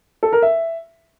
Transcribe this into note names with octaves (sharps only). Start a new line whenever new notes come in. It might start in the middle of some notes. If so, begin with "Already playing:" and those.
A4
A#4
E5